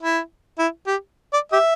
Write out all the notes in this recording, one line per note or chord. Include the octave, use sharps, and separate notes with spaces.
E4
E4
G4
D5
G4 E5